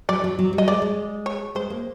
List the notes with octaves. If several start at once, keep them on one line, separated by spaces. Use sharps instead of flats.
F#3 D5
F#3
F#3
G3
D#5
G#3 D5
G#3
C#5
G#3 C5
A#3